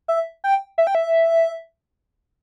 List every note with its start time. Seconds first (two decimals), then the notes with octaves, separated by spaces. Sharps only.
0.08 E5
0.44 G5
0.78 E5
0.87 G5
0.95 E5